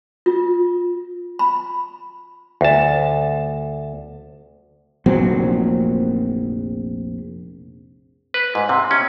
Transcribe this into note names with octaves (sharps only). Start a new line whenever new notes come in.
F4
B5
D2 A5
F1 A#1 F#3 C4
B4
G#2
C3
C#4